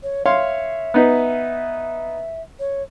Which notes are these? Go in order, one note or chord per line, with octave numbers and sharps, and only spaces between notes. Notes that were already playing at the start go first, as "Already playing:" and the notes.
C#5
C#5 E5 F5 C6
B3 D#4 B4
C#5